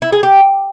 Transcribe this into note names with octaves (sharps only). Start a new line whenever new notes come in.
E4
G#4
G4